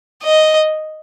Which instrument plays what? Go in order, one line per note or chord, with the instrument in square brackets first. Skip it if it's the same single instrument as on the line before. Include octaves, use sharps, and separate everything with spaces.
[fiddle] D#5